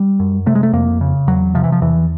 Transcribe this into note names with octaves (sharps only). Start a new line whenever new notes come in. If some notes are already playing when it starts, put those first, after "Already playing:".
Already playing: G3
F#2
C3 A3
G#3
A3
F2 A#3
C#3
E2 F#3
C3 F3
E3
F3
E2 E3